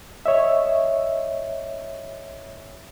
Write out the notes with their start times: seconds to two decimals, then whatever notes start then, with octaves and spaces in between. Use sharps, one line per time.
0.26 C#5 D#5 E5